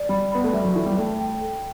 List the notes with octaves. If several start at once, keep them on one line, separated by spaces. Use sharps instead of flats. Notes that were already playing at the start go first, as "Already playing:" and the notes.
Already playing: D5
G3 B5
B3 B5
A3
G3 E5
F#3
E3 A4
G3
A3 G5
G5
A4